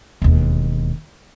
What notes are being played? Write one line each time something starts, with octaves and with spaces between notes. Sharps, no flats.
E1 D#2